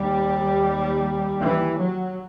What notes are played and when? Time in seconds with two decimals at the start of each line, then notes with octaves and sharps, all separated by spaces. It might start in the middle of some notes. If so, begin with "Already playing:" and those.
Already playing: D#2 G3
1.41 E3
1.77 F#3